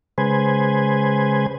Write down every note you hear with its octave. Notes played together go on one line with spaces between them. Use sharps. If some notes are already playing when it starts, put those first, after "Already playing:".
C#3 G#3 B4 C5 G#5